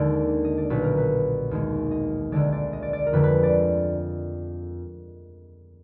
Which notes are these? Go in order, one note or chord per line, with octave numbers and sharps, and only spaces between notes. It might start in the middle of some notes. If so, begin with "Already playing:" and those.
Already playing: D#2 D3 G#3 D5
D#5
D5
B1 A#2 G#3 B4
A#4
B4
D#2 D#3 G#3
D#5
D2 D3 G#3 D5
D5
D#5
D5
D5
A#4
F2 D3 G#3 B4
B4
D5